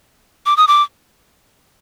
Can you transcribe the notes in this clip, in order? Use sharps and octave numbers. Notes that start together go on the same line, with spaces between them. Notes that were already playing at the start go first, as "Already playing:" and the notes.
D6
D#6
D6